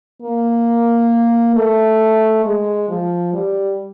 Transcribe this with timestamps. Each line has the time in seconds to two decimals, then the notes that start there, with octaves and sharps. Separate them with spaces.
0.22 A#3
1.56 A3
2.45 G#3
2.89 F3
3.33 G3